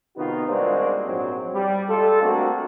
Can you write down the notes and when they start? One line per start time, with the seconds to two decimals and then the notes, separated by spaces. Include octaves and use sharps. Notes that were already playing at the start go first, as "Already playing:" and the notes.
0.17 C3 D#3 B3 D#4 F4 F#4
0.47 G3 G#3 A#3 C4 D4 F#4
1.06 A#1 G#2 F#3 C4
1.54 G3
1.90 G3 G#3 F4 A4
2.23 A3 A#3 C4 D4 F#4